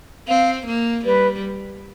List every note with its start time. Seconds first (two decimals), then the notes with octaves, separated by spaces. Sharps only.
0.28 C4 F5
0.66 A#3
1.05 G3 B4